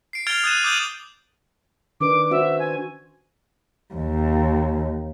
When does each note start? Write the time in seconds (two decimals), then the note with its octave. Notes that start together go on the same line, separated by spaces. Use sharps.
0.13 C7 D7
0.27 F6 G#6 A6 D7 F7 G7
0.44 D#6 F#6 G#6 A6 D#7 E7
0.64 D6 D#6 G6 D#7 F#7
2.01 D#3 D4 B4 D6
2.31 C#4 F#4 C5 E5
2.59 G#5
3.94 D#2